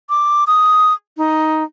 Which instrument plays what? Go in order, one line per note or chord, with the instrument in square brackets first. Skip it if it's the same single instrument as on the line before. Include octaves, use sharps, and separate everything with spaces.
[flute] D6
D#6
D#4